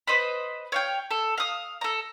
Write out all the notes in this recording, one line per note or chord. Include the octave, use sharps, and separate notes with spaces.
B4 C5 D#5 B5
C#5 F5 G5
A4
F5 D#6
A4 A#5